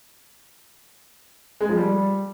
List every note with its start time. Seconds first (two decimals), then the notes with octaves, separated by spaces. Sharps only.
1.61 G#3
1.69 F3
1.77 G3